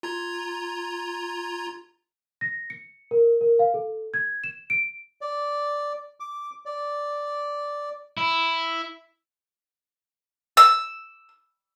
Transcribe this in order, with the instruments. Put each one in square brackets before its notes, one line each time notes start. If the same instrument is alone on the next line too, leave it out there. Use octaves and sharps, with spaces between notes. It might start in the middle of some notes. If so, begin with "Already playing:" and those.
[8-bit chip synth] F4 A#5 G#6
[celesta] A#6
C#7
A#4
A#4
F5
A4
G#6
E7
D7
[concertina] D5
D6
D5
[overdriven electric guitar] E4
[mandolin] E6